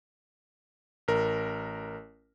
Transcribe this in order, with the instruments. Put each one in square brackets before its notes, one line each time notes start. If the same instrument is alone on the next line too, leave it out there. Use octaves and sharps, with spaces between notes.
[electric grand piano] A1 A#4